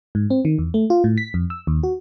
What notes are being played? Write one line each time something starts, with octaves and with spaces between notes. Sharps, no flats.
G#2
C4
D#3
E2
A3
F4
A2
B6
F2
E6
D#2
F#4